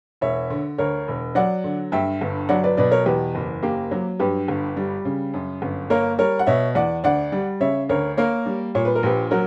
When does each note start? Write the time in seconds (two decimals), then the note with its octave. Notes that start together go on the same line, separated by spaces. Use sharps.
0.21 E1 C#5 E5
0.50 D3
0.78 D2 A#4 C#5
1.08 E1
1.35 F#3 D5 F#5
1.64 D3
1.92 G2 E5 G5
2.21 G1
2.49 F#3 D5 F#5
2.63 B4 D5
2.77 B2 B4 D5
2.91 A#4 C#5
3.06 E2 G4 B4
3.35 F#1
3.63 A#3 G4
3.91 F#3
4.19 G2 G4 B4
4.48 G1
4.77 G3
5.05 C#3
5.34 F#2
5.62 G1
5.90 A#3 A#4 C#5
6.19 G3 A#4 C#5
6.39 F#5
6.47 B2 C#5 E5
6.75 E2 D5 F#5
7.04 D2 D5 F#5
7.32 G3
7.60 C#3 C#5 E5
7.89 D2 A#4 C#5
8.17 A#3 A#4 C#5
8.46 G3
8.75 A#2 C#5
8.85 B4
8.95 A#4
9.03 A#1 G4 B4
9.31 F#3 F#4 A#4